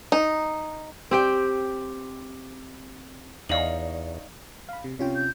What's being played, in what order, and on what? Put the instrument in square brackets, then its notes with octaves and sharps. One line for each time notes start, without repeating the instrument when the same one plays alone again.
[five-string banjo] D#4
[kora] C4 G4 G5
[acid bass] E2 [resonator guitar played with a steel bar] D#4 C#5 F5 [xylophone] D5 F#7
[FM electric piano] F5 B5
C3
[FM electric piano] C3 F4 G5 [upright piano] C#4
[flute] G6